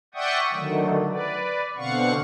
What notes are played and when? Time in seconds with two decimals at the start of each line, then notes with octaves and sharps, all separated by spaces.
0.14 D5 E5 F#5 G5 C#6 D#6
0.52 D3 D#3 F#3 A3
1.09 B4 D5
1.77 B2 D3 C4 F5 F#5 C#6